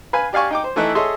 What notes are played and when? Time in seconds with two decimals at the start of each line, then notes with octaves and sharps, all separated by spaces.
0.13 B4 F5 G#5
0.33 G4 D5 F5 G#5 C#6
0.50 D#4 G5 D6
0.64 C5
0.76 E3 A3 D#4 E4 F#6
0.95 G#4 A4 C#5 D#5 E5 C6